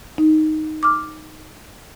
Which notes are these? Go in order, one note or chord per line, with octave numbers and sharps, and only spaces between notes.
D#4
D6 F6